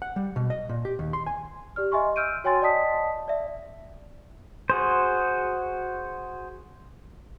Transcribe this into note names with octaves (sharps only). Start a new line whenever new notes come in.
F#5
G3
B2
D#5
A#2
G4
D#2
C6
G#5
G4 D5 F6
D#5 E5 G#5 C6 C#6
E6 F6 G6 D7 D#7
F#4 C#5 G5 G#5 C6 A6
D5 D#5 G5 A5 D#6 B6
D5 E5
F#4 G#4 C5